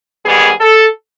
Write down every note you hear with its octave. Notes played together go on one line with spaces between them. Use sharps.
G#2 D#3 G3 B3 G#4
A4